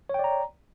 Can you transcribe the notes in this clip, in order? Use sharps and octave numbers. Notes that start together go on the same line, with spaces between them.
C#5 D5 G5 A#5